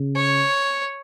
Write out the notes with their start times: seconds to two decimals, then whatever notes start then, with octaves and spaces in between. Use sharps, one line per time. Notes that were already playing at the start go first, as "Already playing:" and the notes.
Already playing: C#3
0.16 C#5